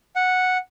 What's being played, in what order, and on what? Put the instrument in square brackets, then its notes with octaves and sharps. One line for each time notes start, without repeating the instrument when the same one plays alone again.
[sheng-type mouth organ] F#5